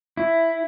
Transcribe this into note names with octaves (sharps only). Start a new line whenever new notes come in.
E4